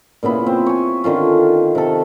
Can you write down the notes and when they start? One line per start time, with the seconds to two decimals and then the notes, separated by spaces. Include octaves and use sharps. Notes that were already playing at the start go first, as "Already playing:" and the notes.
0.23 A#2 C#3 B3 E4
0.46 C4
0.66 C#5 G#5
1.04 D3 D#3 C#4 F4
1.75 C3 A4